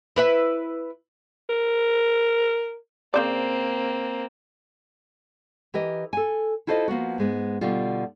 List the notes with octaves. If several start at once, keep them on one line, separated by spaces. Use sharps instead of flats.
E4 B4 E5
A#4
C#3 A#3 C4 C5 D5
E3 G4 A#4 D#5
A4 G#5
E4 F4 A4 C5 D5 D#5
F3 A#3 B3 F#4
G#2 G#3 B3
B2 D3 G3 F4